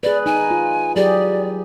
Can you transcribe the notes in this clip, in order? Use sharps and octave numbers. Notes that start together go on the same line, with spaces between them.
G#4 B4 D5
D#4 G#5
F4
F#3 G4 G#4 D5